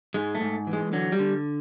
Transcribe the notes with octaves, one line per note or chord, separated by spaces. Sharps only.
G#2 G#3
A3
G#2
E3
G#3
D3 F#3
G3
D3